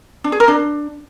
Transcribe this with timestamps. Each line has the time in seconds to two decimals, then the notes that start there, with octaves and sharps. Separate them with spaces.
0.24 D4
0.32 G#4
0.40 A#4
0.48 D4